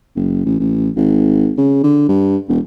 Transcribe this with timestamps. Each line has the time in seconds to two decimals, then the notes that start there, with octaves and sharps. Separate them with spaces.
0.15 F#1
0.45 A1
0.60 A1
0.96 G#1
1.58 C#3
1.83 D3
2.08 G2
2.48 E1